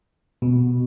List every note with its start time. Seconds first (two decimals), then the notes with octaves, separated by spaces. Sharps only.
0.42 B2